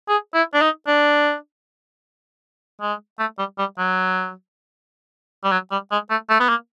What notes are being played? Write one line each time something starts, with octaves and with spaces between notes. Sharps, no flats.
G#4
E4
D4
D#4
D4
G#3
A3
G3
G3
F#3
G3
F#3
G3
G#3
A3
A3
B3
A#3